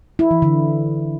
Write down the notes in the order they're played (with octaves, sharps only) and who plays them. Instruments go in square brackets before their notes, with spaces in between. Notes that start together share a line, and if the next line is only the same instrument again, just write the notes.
[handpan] E4
E3
D3